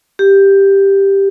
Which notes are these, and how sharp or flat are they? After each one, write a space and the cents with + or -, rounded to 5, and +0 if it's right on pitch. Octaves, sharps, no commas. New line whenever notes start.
G4 +5